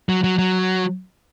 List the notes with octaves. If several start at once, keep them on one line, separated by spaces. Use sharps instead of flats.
F#3
F#3
F#3